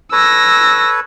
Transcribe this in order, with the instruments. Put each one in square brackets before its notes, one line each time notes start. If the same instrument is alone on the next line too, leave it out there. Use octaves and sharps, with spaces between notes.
[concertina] A4 B4 C#5 [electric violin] E6 A#6